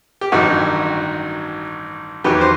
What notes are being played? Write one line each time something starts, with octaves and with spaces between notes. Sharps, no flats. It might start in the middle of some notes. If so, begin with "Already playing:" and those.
G4
A1 G2 D#3 F#3 D#4 F#4
E2 D#3 F#3 G4 B4
C5